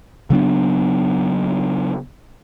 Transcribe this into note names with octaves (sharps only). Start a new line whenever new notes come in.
C#3 F#3 B3 D4